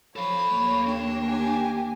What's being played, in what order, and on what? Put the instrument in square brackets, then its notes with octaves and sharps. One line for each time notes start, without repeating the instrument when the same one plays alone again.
[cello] F3 [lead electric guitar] A4 F5 [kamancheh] C#5 [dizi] B5
[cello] D#2 A#3
[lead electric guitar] D4 [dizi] G5
[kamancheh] G4 G#5